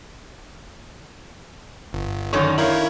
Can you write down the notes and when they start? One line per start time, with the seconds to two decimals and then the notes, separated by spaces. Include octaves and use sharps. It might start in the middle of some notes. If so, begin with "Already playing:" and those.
1.93 G1
2.33 F#2 D3 D#3 F#3 C#4 C#5
2.58 D#3 E4 A#4 C#5 F5 F#7